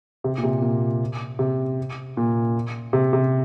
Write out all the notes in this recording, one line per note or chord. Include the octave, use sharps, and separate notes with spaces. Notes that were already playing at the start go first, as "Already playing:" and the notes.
C3
A#2
C3
A#2
C3
A#2
C3
C3